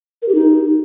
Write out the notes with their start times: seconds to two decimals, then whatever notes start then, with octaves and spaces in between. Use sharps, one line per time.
0.22 A#4
0.28 G4
0.35 D#4